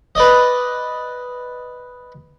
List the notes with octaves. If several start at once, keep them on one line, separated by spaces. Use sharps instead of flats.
B4 D5 D#5